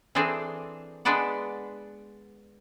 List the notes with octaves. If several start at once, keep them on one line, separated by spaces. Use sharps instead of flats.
E3 C4 D4 G#4 A4 D5
G#3 B3 D4 B4 D5 F#5